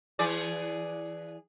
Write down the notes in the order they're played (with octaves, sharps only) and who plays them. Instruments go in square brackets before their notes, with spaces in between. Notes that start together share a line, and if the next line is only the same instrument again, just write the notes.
[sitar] E3 G#4 D5